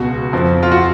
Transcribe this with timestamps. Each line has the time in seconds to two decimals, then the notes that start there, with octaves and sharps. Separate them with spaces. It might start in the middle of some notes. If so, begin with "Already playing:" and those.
Already playing: C#2 B2 F#4
0.33 F2 F3
0.63 F4
0.72 F#4